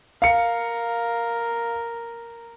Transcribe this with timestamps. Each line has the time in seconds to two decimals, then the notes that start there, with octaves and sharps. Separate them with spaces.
0.22 A#4 F5 C#7